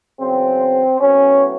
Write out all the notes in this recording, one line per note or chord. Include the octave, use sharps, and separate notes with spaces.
E2 C#3 F#3 C4
A2 F#3 B3 C#4